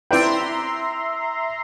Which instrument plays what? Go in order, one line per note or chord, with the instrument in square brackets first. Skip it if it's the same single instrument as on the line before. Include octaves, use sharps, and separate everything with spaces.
[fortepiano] C4 B4 [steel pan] E4 D5 G5 [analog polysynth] E5 A#5 C6